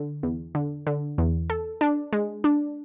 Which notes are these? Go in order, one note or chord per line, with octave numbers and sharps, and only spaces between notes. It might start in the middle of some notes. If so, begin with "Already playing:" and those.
Already playing: D3
E2
D3
D3
E2
A4
D4
G#3
D4